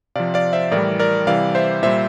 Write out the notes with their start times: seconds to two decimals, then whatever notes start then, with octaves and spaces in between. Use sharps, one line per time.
0.16 C3 F3 D5 F5
0.34 D5 F5
0.53 C5 E5
0.71 A2 E3 G3 A#4 D5
1.00 A#4 D5
1.27 C3 E3 G3 D5 F5
1.55 C5 E5
1.83 A#2 G3 C5 E5